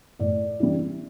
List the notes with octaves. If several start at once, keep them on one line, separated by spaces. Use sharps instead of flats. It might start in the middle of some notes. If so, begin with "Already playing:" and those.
A2 D5
E3 G3